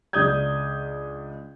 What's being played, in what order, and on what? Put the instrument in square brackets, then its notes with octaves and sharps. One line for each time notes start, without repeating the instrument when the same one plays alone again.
[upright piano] C#2 D4 D5 D#6 G6 G#6